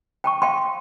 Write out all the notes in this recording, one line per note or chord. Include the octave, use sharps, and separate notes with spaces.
G5 A5 C#6
F5 G5 A5 C6